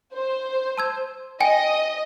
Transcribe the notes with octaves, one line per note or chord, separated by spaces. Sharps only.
C5
A5 E6 G#6
D#5 G5 G#5